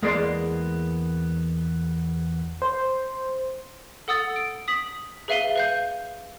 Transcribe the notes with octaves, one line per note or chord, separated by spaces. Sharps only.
E2 G#3 A#3 B3 D5 C6
C5
A4 F#5 D#6 E6 A6
D7
D#6 B6 F#7
G#4 B4 E5 F5 D#7 G7
B4 F5 G6